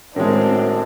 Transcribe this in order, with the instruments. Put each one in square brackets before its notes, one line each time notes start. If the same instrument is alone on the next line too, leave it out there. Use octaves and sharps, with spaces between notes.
[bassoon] F#2 [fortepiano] A2 D#3 G#3 [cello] C4 [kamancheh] D4